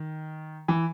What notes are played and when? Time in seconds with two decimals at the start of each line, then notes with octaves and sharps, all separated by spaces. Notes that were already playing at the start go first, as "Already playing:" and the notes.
Already playing: D#3
0.68 E3